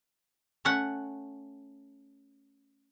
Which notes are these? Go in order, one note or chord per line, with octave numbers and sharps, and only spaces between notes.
A3 C#4 F#5